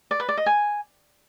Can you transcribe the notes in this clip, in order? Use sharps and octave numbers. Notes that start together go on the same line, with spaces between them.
D5
B4
D5
D#5
G#5